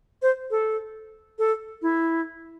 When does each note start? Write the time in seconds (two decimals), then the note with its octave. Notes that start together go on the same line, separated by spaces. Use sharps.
0.22 C5
0.51 A4
1.39 A4
1.82 E4